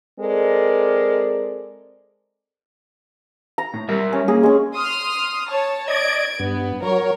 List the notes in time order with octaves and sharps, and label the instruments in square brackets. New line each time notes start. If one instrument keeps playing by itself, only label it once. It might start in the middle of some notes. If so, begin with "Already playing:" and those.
[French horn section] G#3 C4 A4 A#4 D5
[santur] A#5
[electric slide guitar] A2
G3 A#4 E5
[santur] C#4
[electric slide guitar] A#3 [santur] G#4
[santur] G#3 C#4
[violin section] C6 D#6 F6
C#5 A5
[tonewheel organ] D5 D#5 [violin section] G#6 D7
[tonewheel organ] G2 [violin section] B3
[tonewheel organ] F#3 [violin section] A#4 C#5